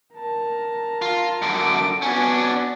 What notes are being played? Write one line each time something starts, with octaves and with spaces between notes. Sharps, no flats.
A#4 A5
F4
F#2 D3 D7
B3 C#4 D4 F#4 G#5